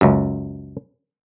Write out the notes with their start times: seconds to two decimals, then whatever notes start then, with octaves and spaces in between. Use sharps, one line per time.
0.01 C#2 F#2